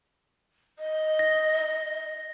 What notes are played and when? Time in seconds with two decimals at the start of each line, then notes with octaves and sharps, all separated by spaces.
0.79 D#5
1.19 A#6